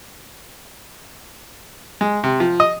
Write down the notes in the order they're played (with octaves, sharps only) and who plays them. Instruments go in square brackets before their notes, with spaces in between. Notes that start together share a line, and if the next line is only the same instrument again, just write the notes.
[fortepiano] G#3
C3
F3
D#5